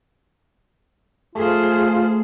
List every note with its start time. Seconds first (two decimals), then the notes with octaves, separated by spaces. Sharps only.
1.35 A3 F4 G#4 C5